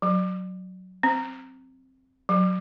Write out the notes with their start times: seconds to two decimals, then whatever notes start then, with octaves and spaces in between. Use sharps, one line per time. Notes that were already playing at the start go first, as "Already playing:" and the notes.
0.02 F#3
1.03 C4
2.29 F#3